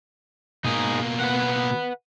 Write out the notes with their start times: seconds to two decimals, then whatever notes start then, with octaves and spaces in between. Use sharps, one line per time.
0.65 B2 A#3 D#4 G#4
1.20 B4 F#5